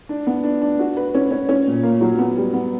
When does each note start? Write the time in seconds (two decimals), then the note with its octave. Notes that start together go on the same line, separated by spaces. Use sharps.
0.09 D4
0.27 B3
0.44 D4
0.62 D4
0.79 F#4
0.97 B4
1.15 C#4
1.31 C#4
1.49 C#4
1.67 A#2
1.83 A#3
2.01 F#3
2.18 B3
2.37 G3
2.53 B3